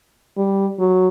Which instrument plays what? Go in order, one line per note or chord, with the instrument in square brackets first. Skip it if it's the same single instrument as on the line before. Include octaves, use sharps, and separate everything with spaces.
[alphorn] G3
F#3